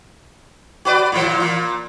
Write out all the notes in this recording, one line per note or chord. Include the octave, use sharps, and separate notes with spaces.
F#4 B4 D5
A#2 E3
A#2